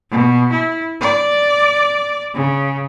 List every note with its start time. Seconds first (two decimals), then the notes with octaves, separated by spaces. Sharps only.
0.11 B2
0.52 E4
1.01 D5
2.35 C#3